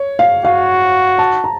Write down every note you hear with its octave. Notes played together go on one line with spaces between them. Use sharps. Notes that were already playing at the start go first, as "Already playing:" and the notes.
Already playing: C#5
F5
F#4 F5
A5
A#5